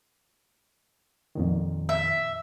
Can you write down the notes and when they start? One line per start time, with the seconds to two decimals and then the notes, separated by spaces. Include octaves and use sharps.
1.35 F2 A#2 D#3
1.89 E5